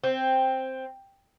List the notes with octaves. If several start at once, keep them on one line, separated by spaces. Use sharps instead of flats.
C4